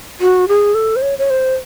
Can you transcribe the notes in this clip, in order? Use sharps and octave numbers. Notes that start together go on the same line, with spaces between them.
F#4
G#4
A4
C5
C#5
C#5
C5